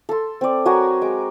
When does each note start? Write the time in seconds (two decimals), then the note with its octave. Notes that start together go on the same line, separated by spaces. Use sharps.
0.09 A4 C6
0.41 C4 D5
0.65 F#3 F#4 A#4 G#5
1.02 G#3 D6